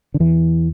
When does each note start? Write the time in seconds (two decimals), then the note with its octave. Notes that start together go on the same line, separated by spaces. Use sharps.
0.14 D3
0.20 E2 E3